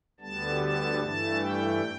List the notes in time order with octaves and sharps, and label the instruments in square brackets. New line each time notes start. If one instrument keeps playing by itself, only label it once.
[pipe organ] D2 D3 G3 B3 A5
A5
G2 E3 A3 A5
G5